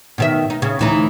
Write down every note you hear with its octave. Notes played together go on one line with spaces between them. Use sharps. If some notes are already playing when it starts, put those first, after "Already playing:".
B2 D#3 E5
D#4
C#3
D2 E3 D#4